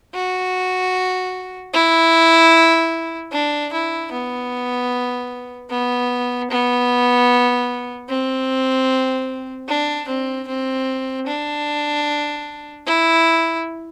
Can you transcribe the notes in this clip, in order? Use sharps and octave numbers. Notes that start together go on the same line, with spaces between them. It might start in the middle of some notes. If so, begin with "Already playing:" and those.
F#4
E4
D4
E4
B3
B3
B3
C4
D4
C4
C4
D4
E4